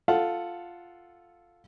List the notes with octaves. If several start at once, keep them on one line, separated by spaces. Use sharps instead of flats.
F4 A4 F5 F#5